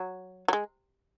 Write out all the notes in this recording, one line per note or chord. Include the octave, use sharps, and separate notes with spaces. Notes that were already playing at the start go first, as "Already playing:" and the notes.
Already playing: F#3
F#3
G#3